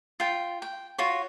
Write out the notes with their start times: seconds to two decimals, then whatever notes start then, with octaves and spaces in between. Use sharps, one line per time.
0.20 F4 G5
0.62 G5
0.98 F4 F#4 C#5